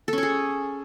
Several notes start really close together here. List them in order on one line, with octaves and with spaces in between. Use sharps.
A4 C#4 C#5 G#4